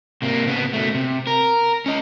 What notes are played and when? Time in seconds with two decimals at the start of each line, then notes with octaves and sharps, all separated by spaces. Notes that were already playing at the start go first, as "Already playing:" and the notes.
0.22 C3 A#3
0.47 C#3 B3
0.73 B2 A3
0.95 C3
1.27 A#4
1.86 C#4 D#5